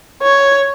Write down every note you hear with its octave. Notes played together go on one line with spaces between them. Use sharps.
C#5